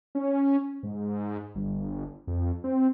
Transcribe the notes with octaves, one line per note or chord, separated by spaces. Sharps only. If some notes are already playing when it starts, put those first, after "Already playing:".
C#4
G#2
G1
F2
C4